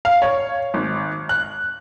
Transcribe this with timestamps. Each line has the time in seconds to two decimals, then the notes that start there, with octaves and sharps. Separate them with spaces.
0.05 F5
0.22 C#5
0.74 G#1
1.29 F#6